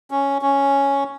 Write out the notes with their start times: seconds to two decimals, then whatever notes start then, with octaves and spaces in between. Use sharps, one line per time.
0.11 C#4
0.42 C#4